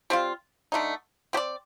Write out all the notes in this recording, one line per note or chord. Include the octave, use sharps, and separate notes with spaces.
G3 C4 F4
D3 A3 D#4
C4 G4 D5